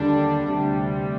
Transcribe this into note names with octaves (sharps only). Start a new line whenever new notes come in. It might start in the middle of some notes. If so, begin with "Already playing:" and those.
Already playing: D#2 D3 G3 D4
D2 C3 G3